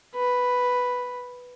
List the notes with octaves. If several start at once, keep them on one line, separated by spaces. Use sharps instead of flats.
B4